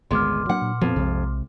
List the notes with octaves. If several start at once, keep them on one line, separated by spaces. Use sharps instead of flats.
G#1 D2 A#2 G#3 B3 C6 D6 F6
F#3 A#3 D4 F#5
A#2
F2 F3 B3
B1 C3 G#3